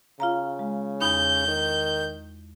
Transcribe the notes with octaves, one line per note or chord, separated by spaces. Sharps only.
C#3 F4 F5 A#5
G#3
E2 D#4 B5 G6
D#3